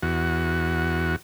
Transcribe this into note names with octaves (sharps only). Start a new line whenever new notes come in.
E2 F#4